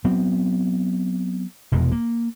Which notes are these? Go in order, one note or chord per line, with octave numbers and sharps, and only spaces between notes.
F#3 B3 C4
F1 E2 B2 G#3
A#3